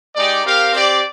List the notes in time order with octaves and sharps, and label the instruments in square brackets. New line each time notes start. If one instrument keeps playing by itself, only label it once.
[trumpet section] G#3 D#4 G4 D5
C4 G4 A#4 F5
C4 G4 D5